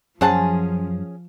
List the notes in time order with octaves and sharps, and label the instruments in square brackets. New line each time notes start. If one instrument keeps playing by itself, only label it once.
[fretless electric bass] F#2 [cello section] F3 [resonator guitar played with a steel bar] C#4 G#4 [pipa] C5 F#5 A5